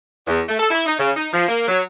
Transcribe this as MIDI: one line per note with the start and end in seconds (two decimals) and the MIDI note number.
0.27 0.41 40
0.48 0.59 57
0.59 0.68 69
0.71 0.81 64
0.86 0.94 63
0.99 1.10 49
1.17 1.27 63
1.33 1.45 53
1.49 1.66 58
1.67 1.82 54